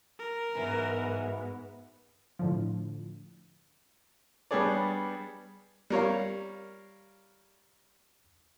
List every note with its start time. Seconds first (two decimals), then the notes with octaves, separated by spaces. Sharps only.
0.19 A#4
0.54 G#2 E3 F#3 B3
2.39 A2 D3 F3
4.51 G3 B3 D4 G#4 C#5 D5
5.90 G3 A#4 C#5 F5